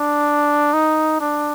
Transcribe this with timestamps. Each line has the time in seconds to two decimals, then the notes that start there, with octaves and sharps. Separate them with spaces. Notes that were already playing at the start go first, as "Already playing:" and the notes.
Already playing: D4
0.73 D#4
1.21 D4